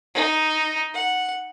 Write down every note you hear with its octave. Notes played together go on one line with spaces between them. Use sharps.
D#4
F#5